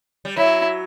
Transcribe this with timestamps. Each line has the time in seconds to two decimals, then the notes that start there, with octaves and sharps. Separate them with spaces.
0.25 G3
0.37 F#3 E4